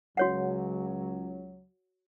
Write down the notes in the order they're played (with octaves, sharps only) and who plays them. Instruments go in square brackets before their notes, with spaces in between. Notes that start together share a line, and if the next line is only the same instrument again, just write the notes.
[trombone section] C#2 F#3 [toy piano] F#4 C#5 F#5